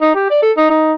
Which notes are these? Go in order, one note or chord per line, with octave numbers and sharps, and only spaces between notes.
D#4
G4
D5
A4
D#4
D#4